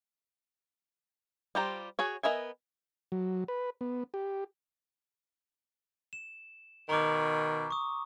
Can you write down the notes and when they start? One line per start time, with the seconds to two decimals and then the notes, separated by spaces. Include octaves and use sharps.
1.55 G3 F4 G4 C5 A#5
1.99 F#4 G#4 C#5
2.23 B3 A#4 D#5 E5 G#5
3.12 F#3
3.48 B4
3.81 B3
4.14 G4
6.13 E7
6.89 B2 D#3 A#5 C#6 D6
7.71 C#6 D#6